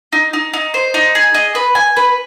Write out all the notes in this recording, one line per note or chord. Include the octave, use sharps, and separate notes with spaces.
D#4
D#4
D#4
C5
D#4
G#4
D#5
B4
G#5
B4